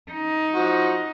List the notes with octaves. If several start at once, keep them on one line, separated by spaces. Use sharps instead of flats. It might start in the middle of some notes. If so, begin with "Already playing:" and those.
D#4
F3 F#4